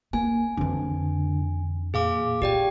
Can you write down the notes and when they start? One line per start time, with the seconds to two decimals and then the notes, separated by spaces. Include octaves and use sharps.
0.13 A#3 G#5
0.57 F2 D3 E3
1.94 A#2 G#4 F5 D6
2.42 F4 G4 D5 G5